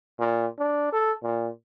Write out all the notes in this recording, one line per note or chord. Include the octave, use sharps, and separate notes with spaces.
A#2
D4
A4
A#2